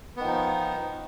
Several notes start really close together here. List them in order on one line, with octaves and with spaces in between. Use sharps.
B3 D#3 F3 D#4